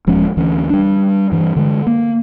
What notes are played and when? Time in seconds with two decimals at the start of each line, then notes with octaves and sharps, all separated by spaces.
0.07 D#1 F3 G#3 C#4
0.37 D2 E3 C#4
0.70 G3 D4
1.32 G2 E3
1.56 D3 G#3
1.87 A#3